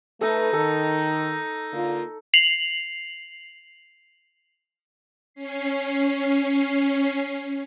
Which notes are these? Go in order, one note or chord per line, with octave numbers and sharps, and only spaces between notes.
A3 D#4 A4 B4
D#3 A4
D3 A#3 F4
C7 F7 F#7
C#4 C7